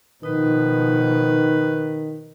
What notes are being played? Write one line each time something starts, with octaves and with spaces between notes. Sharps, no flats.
B2 D#3 F3 D#4 B4